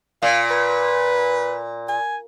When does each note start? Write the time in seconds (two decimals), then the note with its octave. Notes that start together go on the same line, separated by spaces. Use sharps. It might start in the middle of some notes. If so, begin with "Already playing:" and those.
0.23 A#2 F5
0.51 B4
1.89 G#5